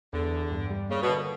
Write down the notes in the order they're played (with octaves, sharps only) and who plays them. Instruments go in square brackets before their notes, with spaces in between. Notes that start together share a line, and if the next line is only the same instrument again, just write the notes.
[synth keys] E2 [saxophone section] D3
[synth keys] E2
G2
G3
[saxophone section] C#3 [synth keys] A#3
[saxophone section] B2
[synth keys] D3